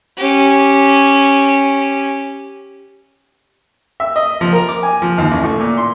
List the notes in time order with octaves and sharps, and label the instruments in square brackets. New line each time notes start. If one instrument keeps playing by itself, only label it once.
[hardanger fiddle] C#4 G4
[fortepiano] E5
D#5
F3
A#4
D6
G#5
F3
D#2
A1
A2
A#2
C6